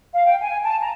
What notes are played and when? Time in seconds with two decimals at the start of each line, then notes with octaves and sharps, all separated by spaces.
0.13 F5
0.26 G5
0.41 G#5
0.64 A5
0.82 A#5